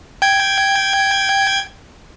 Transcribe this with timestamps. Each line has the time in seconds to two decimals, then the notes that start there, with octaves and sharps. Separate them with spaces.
0.22 G5 G#6